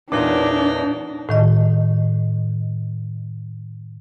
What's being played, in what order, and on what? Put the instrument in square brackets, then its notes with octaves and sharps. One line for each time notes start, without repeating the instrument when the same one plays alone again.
[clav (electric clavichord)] E2 A#2 [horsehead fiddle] D4 [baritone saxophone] D#4 [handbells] B4 C#5 D6
[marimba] A2 D#3 D#5